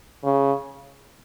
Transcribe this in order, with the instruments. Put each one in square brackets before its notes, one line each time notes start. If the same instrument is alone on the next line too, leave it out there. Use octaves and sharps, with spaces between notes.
[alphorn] C#3